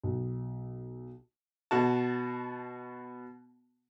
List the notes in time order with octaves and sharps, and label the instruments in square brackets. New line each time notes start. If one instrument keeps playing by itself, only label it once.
[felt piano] B1
[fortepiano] B2 F#4 A5